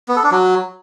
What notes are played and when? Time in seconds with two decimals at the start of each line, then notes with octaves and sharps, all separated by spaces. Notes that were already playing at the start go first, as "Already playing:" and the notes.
0.08 B3
0.16 A4
0.24 D4
0.32 F#3